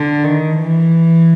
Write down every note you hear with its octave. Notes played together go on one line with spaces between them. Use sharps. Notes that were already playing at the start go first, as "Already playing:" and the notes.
Already playing: D3
D#3
E3